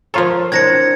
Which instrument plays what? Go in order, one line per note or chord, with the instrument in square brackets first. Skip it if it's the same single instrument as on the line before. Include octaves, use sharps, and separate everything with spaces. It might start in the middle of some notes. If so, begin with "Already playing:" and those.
[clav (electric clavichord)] F3 F4 A4 [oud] A#4 C#5 [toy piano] A#5 C6
[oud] C4 D4 A#4 [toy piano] E4 C5 [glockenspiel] G#6 A#6 C#7